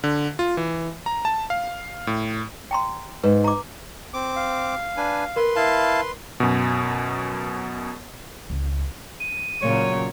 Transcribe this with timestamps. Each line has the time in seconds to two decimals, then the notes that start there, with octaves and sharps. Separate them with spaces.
0.04 D3
0.39 F4
0.57 E3
1.06 A#5
1.25 A5
1.50 F5
2.07 A2
2.71 G5 A#5 C6
3.23 G#2 B4
3.44 A#5 D6
4.14 C4 D6
4.36 F5
4.97 D4 B4 G#5
5.36 A#4 B4 C6
5.56 E4 F5 A5
6.40 F#2 B2
8.50 C#2
9.20 D#7
9.61 A#2 C#3 F#3 C#5